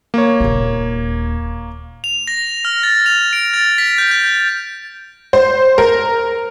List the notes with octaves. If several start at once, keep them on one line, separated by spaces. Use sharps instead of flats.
A#3 C#5
D#1 D#4
F7
A#6
F6
A6
F7
D7
A6
B6
G6
G6
C5
A#4